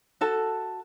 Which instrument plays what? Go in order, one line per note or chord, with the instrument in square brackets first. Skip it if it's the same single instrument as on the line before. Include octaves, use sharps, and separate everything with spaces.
[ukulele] F#4 A4 A5